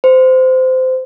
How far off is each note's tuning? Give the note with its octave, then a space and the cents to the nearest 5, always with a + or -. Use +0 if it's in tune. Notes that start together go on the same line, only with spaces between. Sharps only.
C5 -20